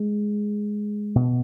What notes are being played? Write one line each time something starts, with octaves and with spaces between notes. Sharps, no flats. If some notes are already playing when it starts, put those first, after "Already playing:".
Already playing: G#3
B2